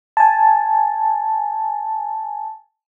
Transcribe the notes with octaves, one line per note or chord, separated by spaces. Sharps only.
G#5 A5